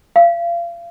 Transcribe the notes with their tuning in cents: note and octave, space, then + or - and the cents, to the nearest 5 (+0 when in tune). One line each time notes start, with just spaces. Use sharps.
F5 -35